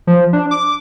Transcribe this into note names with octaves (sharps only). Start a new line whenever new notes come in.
F3
D4
D6